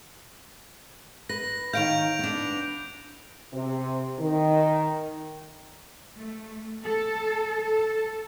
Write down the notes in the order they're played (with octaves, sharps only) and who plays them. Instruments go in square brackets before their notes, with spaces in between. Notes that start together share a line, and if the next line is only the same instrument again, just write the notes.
[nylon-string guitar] B4 [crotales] A#6
[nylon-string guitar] D#3 C#5 F5 [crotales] G6 D7 F7
[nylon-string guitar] B3 D4
[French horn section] C3
D#3
[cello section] A3
A4
A4